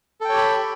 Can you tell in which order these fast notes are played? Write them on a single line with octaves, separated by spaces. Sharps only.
A4 G5 C#5 G4 B5